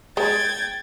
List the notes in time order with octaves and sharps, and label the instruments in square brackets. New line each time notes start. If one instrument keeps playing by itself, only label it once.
[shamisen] G#3 [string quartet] G5 G#6 A6